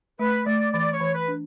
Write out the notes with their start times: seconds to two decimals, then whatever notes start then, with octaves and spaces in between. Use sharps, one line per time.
0.19 A3 B4
0.46 A3 D5
0.73 E3 D5
0.93 C#5
1.00 E3
1.15 B4
1.28 D4